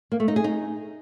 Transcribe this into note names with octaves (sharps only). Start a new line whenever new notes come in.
A#3
A3
D#4
G#4
D#4